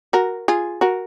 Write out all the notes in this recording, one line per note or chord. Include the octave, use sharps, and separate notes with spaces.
F#4 A#4
F4 G#4
F#4 A#4